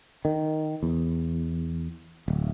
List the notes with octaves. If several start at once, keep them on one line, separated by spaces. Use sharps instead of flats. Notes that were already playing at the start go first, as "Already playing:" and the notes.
D#3
E2
D1